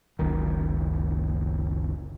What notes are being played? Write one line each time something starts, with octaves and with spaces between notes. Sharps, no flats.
F#1 C#2 D#3